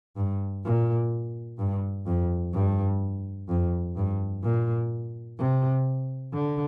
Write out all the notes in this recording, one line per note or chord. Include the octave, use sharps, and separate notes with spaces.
G2
A#2
G2
F2
G2
F2
G2
A#2
C3
D3